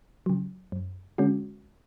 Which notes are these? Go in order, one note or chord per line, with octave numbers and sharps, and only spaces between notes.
C#3 F#3
F#2
D3 G#3 C#4 F#4